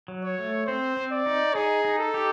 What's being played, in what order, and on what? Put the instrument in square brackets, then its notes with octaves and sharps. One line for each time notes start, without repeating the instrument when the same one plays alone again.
[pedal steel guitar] F#3
[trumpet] C#5
[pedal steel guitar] A3
[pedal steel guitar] C4 [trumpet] C5
[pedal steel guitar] C4
[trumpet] D5
[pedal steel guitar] D#4
[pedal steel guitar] D#4 [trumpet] G#4
[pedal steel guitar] D#4
[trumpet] A4
[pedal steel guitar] G4